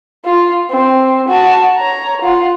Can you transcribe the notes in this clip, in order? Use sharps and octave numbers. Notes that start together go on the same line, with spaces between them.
F4
C4
F#4 A5
C#5 A#5
F4 F#5